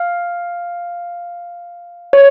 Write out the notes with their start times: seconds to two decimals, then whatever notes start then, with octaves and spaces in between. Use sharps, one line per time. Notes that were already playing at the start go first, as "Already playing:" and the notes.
Already playing: F5
2.13 C#5